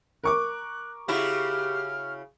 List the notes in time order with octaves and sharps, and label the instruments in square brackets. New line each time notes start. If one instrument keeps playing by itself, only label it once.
[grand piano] A#4 C#6 D6 [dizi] F#6
[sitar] C#3 E4 F#4 [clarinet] G4 [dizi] F6